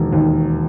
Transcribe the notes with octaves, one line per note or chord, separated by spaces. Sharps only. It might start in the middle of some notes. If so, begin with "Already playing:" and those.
Already playing: E1 D#2
D#2